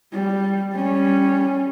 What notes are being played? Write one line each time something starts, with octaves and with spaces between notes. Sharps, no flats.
G3
G3 C#4